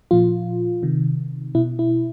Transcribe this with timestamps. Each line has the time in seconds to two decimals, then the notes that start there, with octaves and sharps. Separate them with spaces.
0.11 A#2 F3 F4
0.83 C3 D#3
1.55 B2 E4
1.79 E4